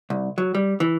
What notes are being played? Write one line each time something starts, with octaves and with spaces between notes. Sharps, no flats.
C2
F#3
G3
E3